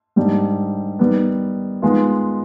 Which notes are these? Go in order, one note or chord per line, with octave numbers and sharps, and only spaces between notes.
G#2 D#3 G3 D4 G4
D#3 G3 B3
D#3 G#3 B3 F4